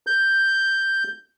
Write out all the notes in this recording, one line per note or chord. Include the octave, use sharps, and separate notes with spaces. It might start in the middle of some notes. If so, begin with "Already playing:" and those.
G6